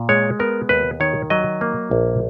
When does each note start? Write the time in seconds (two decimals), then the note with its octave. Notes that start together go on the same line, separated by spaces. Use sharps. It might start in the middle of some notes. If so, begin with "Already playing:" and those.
Already playing: A#2
0.09 G#3 C#5
0.39 B3 A#4
0.69 D#2 B4
1.00 D#3 C#5
1.30 F#3 D#5
1.61 A#3
1.91 A#1